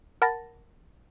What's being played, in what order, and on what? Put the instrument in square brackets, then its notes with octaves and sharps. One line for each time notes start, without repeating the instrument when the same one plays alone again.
[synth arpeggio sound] A#4 F#5 A5 B5 A6 A#6